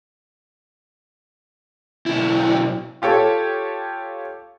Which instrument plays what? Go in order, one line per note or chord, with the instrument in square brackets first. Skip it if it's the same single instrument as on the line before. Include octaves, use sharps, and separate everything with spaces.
[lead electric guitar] B1 E4
[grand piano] F4 G4 A4 C#5